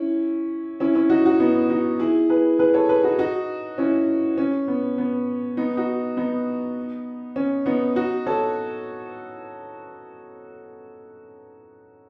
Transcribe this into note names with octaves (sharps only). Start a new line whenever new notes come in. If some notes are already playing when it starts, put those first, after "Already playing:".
Already playing: C#4 E4
C#4 E4
C#4 E4
D#4 F#4
D#4 F#4
B3 D#4
D#4 F#4
E4 G#4
G#4 B4
G#4 B4
A4 C#5
G#4 B4
D#4 F#4
D#4 F#4
C#4 E4
C#4
B3
B3
B3 D#4
D#4 F#4
B3 D#4
C#4
B3 D#4
D#4 F#4
A4 C#5